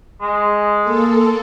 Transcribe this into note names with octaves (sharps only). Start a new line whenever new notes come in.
G#3
A#3 A4